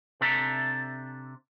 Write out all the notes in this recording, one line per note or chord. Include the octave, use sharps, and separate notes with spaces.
C3 C4 D4 A4 E5 A#5